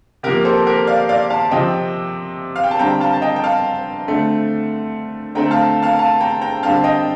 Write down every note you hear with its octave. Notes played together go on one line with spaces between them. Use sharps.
C3 F3 A#3 G4 A#4
A4 C5
G4 A#4
D5 F5
D5 F5
F5 A5
C3 F3 C4 D#5 G5
F5
G5
A5
D3 G3 C4 G5 A#5
F5 A5
A5
D#5 G5
G5
F5 A5
D3 A3 C4
D3 A3 C4 G5 A#5
F5 A5
F5 A5
F5 A5
G5 A#5
G5 A#5
D3 G3 C4 F5 A5
D#5 G5